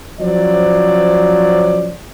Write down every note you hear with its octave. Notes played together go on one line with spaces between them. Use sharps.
F3 F#3 C#4 C5 D5